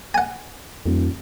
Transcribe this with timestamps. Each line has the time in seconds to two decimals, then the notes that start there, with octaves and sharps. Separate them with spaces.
0.14 F#5 G#5
0.86 D#1 F2